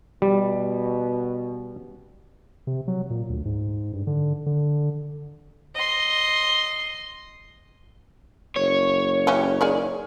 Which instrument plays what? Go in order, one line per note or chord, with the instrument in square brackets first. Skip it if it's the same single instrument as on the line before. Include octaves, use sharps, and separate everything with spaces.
[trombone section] B2 [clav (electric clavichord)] G3
[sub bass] C3
F#3
A#2
D2
G#2
G2
D3
D3
[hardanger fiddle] D#5 C6
[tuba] F#1 [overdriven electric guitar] C#5
[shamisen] E3 C#4 G4
D#3 G#4 D5